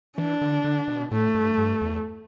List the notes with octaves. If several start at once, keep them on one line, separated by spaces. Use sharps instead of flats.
E3 D4
D3
D3
B2
A2 A3
G2
G2
E2